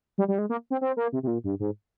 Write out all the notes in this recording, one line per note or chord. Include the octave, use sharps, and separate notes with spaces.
G3
G3
G#3
A#3
C4
C4
A#3
C3
C3
A#2
G2
G#2